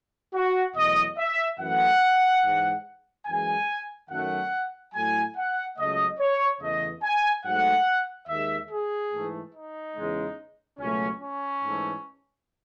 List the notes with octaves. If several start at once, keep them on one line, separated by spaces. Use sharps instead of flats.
F#4
E2 B2 F#3 A3 D#5
E5
F#2 E3 A3 F#5
G#2 E3 G#3
F#2 E3 G#3 G#5
F#2 D#3 F#3 A3 F#5
A2 F#3 A3 G#5
F#5
C#2 C#3 F#3 A3 D#5
C#5
E2 C#3 E3 A3 D#5
G#5
G#2 F#3 A3 F#5
D#2 D#3 G#3 E5
G#4
G#2 E3 A3
D#4
E2 C#3 G#3
C#2 B2 F#3 A3 C#4
C#4
G#2 E3 A3